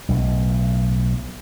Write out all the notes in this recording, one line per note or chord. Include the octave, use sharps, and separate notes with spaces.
B1 A2